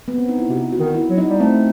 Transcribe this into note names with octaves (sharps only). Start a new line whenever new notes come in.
B3
C4
D#4
E4
C3 F#4
F#4
D#3
E4
F#3
D#4
G3
A3 C4